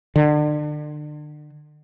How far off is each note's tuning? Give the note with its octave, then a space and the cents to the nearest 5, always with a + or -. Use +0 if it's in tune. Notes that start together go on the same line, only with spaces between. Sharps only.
D3 +35